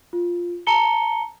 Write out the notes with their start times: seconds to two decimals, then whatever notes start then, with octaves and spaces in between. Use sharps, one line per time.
0.13 F4
0.67 A5 A#5 C#7 G7